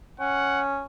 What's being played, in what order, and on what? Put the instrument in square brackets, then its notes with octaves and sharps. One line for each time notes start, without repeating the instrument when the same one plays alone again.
[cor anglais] C#4 [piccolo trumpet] F#5